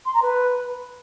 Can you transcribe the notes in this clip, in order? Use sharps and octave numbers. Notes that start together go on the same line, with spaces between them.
C6
A#5
B4